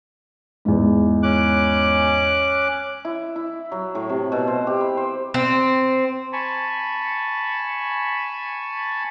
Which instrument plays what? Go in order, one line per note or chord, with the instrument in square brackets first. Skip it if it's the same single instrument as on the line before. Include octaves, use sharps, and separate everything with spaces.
[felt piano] E2 G#2
[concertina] C#4 D6 F#6
[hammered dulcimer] E4
E4
F#3
A2
C3
B2
C5
G4
B5
C5
[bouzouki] C4
[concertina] G#5 A5 B5 C#6